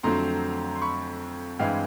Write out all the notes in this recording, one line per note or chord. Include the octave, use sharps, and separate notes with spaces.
F2 D3 F#3 A3 C4 A#5 C6
C6
B5 C#6
G2 E3 G#3 C4 F5 G5